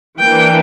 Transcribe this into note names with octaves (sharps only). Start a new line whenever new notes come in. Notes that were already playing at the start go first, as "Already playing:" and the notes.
E3 A#3 D4 G5